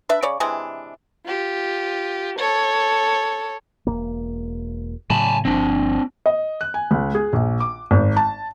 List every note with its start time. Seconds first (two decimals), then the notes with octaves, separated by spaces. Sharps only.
0.09 D4 B4 E5
0.23 C#3 C#5 D5
0.40 C3 E3 G#3 D4
1.26 F4 G4
2.38 A4 C#5
3.87 E1 F#2 A#3
5.10 A2 C#3 F#3 G#5 A5 B5
5.45 G1 C#2 F3 C4 D4
6.26 D#5
6.61 F#6
6.74 G#5
6.91 C#2
7.15 G#4
7.33 A#1
7.60 D6
7.91 G#1
8.17 A5